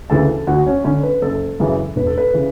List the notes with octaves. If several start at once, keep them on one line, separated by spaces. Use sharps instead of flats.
D2 C#3 E3 A4 A5
D2 F#4 F#5
C#4 C#5
D3 C#4 C#5
B4
F#1 A4
F#2 C#3 E3
E1 B4
A4
B4
C#3 E3